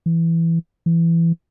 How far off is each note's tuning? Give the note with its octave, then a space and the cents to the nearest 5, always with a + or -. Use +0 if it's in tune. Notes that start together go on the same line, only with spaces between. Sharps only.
E3 +10
E3 +20